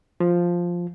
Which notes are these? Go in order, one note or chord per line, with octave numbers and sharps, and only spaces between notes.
F3